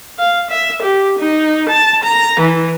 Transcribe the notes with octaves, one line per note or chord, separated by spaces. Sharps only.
F5
E5
G4
D#4
A5
A#5
E3